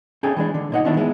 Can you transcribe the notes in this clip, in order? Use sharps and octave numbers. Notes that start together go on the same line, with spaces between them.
C#4 G#4 A4 G5 G#5
E3 G#3 D4
D3
B1 A#2 D#4 F#5
D3 D#3 F3 B3 D4 E4
G#3 B3 E4